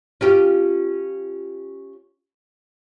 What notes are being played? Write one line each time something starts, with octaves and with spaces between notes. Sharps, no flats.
C#4 F4 G4